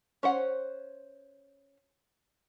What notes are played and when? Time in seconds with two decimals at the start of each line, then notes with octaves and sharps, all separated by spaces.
0.23 C#4 C5 F#5